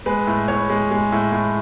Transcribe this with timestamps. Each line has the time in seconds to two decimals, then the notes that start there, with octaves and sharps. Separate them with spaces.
0.06 G#3 B4
0.27 A2
0.48 A2 C#5
0.69 G#3
0.91 G#3
1.12 A2
1.32 A2